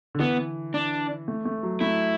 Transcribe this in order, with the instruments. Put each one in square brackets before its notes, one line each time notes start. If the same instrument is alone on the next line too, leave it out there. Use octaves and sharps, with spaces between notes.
[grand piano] D3
[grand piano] E3 [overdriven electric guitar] B3
[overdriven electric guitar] D4
[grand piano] A3
A3
F#3
[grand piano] A3 [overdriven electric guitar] E4